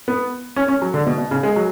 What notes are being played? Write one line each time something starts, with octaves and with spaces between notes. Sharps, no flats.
B3
C#4
C#4
F#3
D3
B2
B2
C#3
G#3
F#3